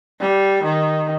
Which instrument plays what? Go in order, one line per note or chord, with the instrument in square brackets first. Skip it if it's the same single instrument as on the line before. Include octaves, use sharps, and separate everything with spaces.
[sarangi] G3
D#3